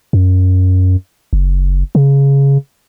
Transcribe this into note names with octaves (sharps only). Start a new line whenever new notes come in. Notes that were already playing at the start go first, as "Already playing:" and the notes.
F#2
F#1
C#3